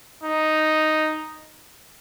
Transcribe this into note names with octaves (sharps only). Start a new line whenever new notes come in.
D#4